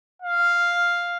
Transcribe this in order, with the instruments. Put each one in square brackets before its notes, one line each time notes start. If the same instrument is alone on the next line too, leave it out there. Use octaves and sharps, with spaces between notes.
[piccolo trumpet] F5